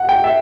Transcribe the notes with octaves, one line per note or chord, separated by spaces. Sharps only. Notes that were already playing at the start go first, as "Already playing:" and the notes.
Already playing: F#5
G5
E5